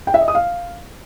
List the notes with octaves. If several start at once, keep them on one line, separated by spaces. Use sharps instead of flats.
G5
E5
D#5
D#6
F5